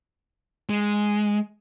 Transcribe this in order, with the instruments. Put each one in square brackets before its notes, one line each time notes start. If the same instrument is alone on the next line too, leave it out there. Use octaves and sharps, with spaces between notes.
[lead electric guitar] G#3